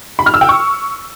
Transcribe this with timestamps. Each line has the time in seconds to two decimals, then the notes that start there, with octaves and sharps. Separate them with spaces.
0.19 B5
0.26 F6
0.34 E6
0.41 G5
0.49 C#6